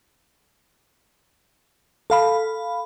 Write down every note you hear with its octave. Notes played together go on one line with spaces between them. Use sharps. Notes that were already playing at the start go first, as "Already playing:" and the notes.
A4 F5 B5